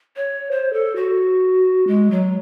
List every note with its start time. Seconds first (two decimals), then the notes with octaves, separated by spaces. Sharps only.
0.16 C#5
0.51 C5
0.73 A4
0.96 F#4
1.87 G#3
2.11 F#3